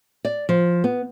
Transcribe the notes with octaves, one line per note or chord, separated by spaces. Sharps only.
D5
F3
B3